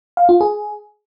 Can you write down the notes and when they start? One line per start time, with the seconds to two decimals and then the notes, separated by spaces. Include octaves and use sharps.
0.17 F5
0.29 F4
0.41 G#4